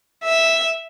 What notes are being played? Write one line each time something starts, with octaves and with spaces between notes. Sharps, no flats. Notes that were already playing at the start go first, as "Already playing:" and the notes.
E5